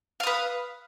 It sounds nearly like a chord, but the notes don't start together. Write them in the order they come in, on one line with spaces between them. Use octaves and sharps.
F5 D#6 B4